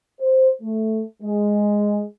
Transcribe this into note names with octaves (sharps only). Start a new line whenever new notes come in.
C5
A3
G#3